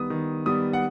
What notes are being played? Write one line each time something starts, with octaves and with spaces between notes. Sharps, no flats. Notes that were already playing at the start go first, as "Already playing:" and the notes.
Already playing: D#3 G3 B3 D#6
D#3
G3 B3 D#6
F#5